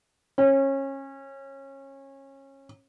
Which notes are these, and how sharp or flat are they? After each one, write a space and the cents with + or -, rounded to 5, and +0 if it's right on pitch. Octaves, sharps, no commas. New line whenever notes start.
C#4 -25